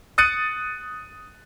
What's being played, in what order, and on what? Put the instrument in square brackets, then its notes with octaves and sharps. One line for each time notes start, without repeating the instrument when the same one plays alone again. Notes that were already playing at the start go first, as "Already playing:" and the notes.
[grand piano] D#6 F#6 A6 C#7 D#7